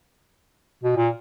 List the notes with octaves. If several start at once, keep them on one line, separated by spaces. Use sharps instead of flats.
B2
A#2